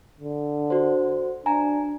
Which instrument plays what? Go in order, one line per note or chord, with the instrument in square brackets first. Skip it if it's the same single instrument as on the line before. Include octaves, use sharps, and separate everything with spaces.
[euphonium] D3
[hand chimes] F#4 C5
[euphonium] D4 [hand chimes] G#5 A#5